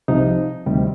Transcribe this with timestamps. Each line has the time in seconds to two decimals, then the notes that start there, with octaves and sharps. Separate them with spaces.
0.08 C2 C3 F3 D#4
0.66 D2 C3 D#3 G3